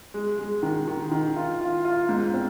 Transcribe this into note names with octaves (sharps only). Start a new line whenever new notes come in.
G#3
G#3
D#3
D#3
D#3
F4
F4
F4
G#2
C4